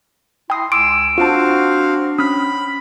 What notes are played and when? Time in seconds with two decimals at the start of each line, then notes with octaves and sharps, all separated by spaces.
0.50 E4 G5 C6 D#6 A#6
0.72 C#2 G#5 C6 D6 E6 D7
1.18 C4 D4 F4 F#4 F5 A5
2.19 C#4 B5 D#6 F6